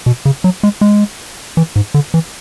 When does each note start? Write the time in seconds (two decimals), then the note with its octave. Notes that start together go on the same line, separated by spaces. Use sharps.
0.06 B2
0.25 C#3
0.44 F#3
0.63 G#3
0.81 G#3
1.57 E3
1.76 G#2
1.94 D3
2.14 E3